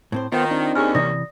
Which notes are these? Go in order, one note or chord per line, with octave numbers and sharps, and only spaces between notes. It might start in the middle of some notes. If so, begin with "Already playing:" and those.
A2 C4 C5
D#3 B3 F4 C5
C4 D4 D#4
D#2 C#4 G#4 G#5 F6
C3 E3 D5 D#6 A#6